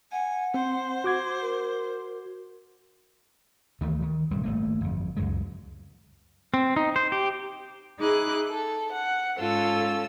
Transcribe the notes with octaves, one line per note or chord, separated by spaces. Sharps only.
F#5 G#5
C4 C5
F#4 D6 G#6
A#4
D2 D#3 E3 A3
D#3
D1 C2 G2 G3
G#1 A3 A#3
G1 F2
C#2 F#2 G#3
C4
D#4
C5
G4
D#4 E4 G#4 D6 F#6
A4
F#5
G#2 C#4 F4 A4 E6